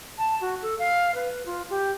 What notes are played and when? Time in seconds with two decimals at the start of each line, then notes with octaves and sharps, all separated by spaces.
0.18 A5
0.41 F#4
0.62 A4
0.79 F5
1.15 B4
1.46 F4
1.70 G4